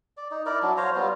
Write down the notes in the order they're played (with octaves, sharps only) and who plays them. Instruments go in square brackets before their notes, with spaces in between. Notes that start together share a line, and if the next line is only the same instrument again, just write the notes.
[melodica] D5
D#4
E4 A#4 D5
F#3 D4
C5 C#5 F5 A#5
G3 B3 F4